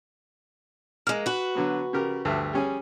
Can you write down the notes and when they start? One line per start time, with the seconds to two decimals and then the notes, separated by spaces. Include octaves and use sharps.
1.07 G#3 A#3 F6
1.26 F#4 B4
1.55 D3 F#3 B3
1.93 C#3 G4 A#4
2.25 D2 G2 A3
2.53 G3 C#4 G#4